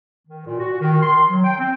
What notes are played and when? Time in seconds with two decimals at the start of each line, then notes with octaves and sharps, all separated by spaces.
0.27 D#3
0.46 A#2
0.59 F#4
0.79 D#3
1.00 C6
1.29 F#3
1.43 G5
1.59 C4